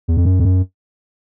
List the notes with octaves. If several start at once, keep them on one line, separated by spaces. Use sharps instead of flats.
E2
F2
F#2
F2
F#2